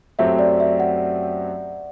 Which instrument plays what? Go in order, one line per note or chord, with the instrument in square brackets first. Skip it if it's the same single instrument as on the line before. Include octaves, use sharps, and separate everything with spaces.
[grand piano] F#2 F#3 A3 C4 G4 [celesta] E5
[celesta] D5
E5
F#5